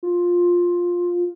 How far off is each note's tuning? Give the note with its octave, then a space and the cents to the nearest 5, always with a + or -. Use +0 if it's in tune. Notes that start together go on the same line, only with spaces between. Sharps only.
F4 +10